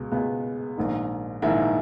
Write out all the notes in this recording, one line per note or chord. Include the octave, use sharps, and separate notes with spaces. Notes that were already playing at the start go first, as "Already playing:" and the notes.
Already playing: C#2 B2 G#3 B3
C#2 B2 G#3 B3
A#1 G#2 D#3
A#1 G#2 D#3 E4